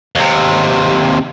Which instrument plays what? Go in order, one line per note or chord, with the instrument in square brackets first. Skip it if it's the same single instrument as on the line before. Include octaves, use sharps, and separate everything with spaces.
[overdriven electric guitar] D#2 C3